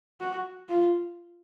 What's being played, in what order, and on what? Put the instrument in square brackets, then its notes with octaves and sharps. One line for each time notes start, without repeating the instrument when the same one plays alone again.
[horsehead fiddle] F#4
F4